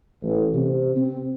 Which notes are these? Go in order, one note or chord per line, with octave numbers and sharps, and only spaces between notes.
A1
C3
C4